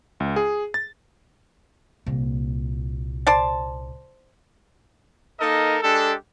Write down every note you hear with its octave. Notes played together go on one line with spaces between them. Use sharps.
C#2
G#4
A6
C2 A#2
C5 D5 A5
A#3 D#4 A4 A#4 D#5
G#3 D4 G4 A4